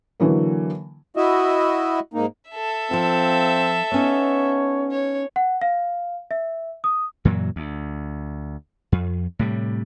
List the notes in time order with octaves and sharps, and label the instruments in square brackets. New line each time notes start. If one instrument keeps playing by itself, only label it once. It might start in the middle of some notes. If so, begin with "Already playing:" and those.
[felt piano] D3 E3 F#3 A#3
[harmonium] E4 F#4 D#5 E5
G#2 A#3 D#4
[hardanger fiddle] A4 E5
[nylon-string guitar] F3 F4 [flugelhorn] C4
[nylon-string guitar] B3 C#4 D#4 [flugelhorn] C#5
[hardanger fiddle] C#5
[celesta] F#5
F5
E5
D#6
[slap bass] F#2 A#2 E3 F#3
D2
F2
A2 C3 G3